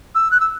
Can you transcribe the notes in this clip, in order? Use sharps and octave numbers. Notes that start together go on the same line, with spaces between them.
E6
F#6
E6